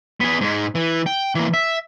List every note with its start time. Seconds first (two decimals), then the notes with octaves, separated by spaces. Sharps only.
0.20 B3 G#4
0.41 G#2 G#3
0.75 E3
1.06 G5
1.35 E3 A#3
1.54 E5